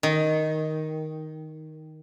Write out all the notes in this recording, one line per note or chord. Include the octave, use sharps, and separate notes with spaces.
D#3